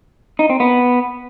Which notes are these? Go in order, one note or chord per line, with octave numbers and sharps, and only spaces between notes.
D#4
C4
B3